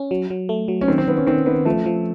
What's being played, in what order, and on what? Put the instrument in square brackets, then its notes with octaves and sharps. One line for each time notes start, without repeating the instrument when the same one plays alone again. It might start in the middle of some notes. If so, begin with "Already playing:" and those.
Already playing: [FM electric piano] C#4
F#3
F#3
A3
F#3
[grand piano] C#4
[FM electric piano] D#3 [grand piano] C4
[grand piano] C4
[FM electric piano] D#3 [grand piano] B3
[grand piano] C#4
[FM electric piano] D#3 [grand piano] C4
[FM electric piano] D#3 [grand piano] B3
[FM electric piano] F3 [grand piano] A3
[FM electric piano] F3